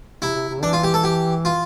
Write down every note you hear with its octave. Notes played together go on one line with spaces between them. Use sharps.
C3 E4
C3
C3
E3 D4
F4
G4
A4
G4
F4